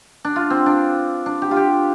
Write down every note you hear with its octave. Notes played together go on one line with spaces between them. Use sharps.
D4
F4
C4
D4
D4
G4
F4
G4